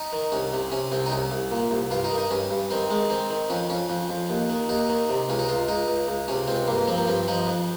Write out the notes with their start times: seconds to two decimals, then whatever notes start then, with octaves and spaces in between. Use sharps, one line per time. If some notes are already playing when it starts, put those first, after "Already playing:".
Already playing: D#4
0.13 D#3
0.32 C2 C#4
0.53 C3
0.72 C3 C#4
0.92 C2 C4
1.06 D#4
1.12 C2 C#4
1.31 C2
1.52 A#2
1.71 C2
1.91 G2 F4
2.04 D#4
2.11 D#3
2.18 D#4
2.31 G2 C#4
2.51 G2
2.71 D#3 C4
2.90 D#3 G#3
3.10 D#3 C4
3.30 D#3
3.50 F2 C#4
3.70 F2 C#4
3.90 F2
4.09 F2
4.30 D#2
4.50 D#3
4.69 D#2 D#4
4.89 D#3
5.09 C3
5.29 C#2 C#4
5.39 D#4
5.49 C#2 F4
5.68 C#2 D#4
5.88 C#2
6.08 C#2
6.28 C3 C#4
6.48 C#2 C4
6.67 G2 A#3
6.78 A#3
6.87 F3 C4
6.98 A#3
7.07 G2 C4
7.28 F3 D#4
7.47 F2